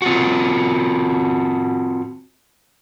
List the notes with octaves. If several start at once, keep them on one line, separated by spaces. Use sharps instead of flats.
C4 F4 F#4